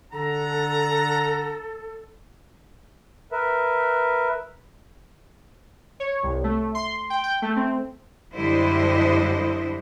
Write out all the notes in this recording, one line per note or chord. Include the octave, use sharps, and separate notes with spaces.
D3 A4 F#5 A#5
A#4 B4 E5
C#5
C2
A3
C6
G5
G5
A3
C4
F#2 D3 G3 E4 C5 D#5